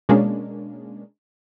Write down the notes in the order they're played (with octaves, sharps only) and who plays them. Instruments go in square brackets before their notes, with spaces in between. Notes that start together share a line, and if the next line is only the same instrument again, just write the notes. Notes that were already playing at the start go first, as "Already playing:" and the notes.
[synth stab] B2 G#3 A#3 C#4 D4